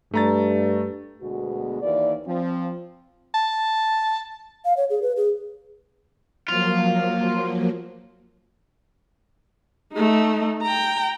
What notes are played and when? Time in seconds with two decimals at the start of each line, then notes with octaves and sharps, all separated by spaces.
0.14 G2 A3 A#5 A6
1.22 D2 B2 G#3 B3 F#4
1.82 D#2 E3 A#3 D5
2.26 F3 C4
3.34 A5
4.65 F5
4.77 C#5
4.90 G#4
5.02 B4
5.17 G#4
6.48 F3 F#3 A#3 F4
9.94 A3 D#4
10.62 G5 A#5